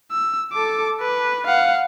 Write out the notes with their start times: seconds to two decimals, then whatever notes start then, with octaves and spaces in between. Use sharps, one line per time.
0.11 E6
0.53 A4 D6
1.01 B4
1.47 F5 F#5